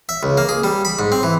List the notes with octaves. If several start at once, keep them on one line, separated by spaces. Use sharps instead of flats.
E5
C#2
A#3
G#4
G3
B5
G#2
C4
E3